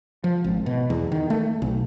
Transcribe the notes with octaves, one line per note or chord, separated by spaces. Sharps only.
F3
G#1
B2
E2
D#3
A3
B1